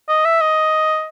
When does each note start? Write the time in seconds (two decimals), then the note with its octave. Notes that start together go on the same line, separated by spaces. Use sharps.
0.09 D#5
0.25 E5
0.41 D#5